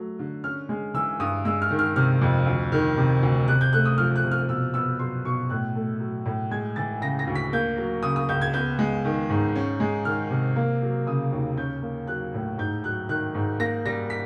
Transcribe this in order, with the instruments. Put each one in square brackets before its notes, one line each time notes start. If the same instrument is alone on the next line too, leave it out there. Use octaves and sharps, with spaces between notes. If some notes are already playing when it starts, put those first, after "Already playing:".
Already playing: [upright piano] F#3 A3
D3
C#4 F6
G#3
E3 E6
G2 D#6
G#3 E6
F6
D#3
F6
C3 F6
F2
D2
D#3
C3
D2
C3 F#6
G6
A3 F#6
D#6
F3 F6
F#6
C3
F6
B2 E6
B3 E6
F#3 C6
B2 C#6
A2 F#6
A3
F#3
A2
G#3 G#6
E3 A6
C#3 A#6
A#6
D2
B6
A#3 G6
F#3
C#3 D#6
D#6
C#2 G6
G#6
B3 G6
G#3
D#3
G#2
C#4
G#3
D#3 F6
C3
A#3
F#3
C#3 D#6
D#2
C#4 G6
A#3
F#3 F#6
A2
G#2 G6
F#3 F#6
D#3 F#6
G#2
A#3 A#6
G3 A#6
B6